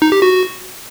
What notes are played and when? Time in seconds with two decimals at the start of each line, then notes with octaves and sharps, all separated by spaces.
0.02 D#4
0.12 G4
0.22 F#4